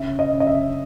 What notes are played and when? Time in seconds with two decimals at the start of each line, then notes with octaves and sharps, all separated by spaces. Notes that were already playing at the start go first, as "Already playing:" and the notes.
Already playing: C#3 E5
0.19 D#5
0.33 C#3
0.40 D#5
0.47 E5